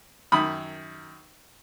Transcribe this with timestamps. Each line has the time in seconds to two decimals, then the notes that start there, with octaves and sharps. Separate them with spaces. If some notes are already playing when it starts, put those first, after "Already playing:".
0.32 F#2 D#3 B5 D#6